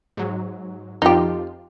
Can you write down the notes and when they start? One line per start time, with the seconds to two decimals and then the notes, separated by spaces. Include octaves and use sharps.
0.17 G#2 F#3
1.02 F2 F3 D#4 F4 G4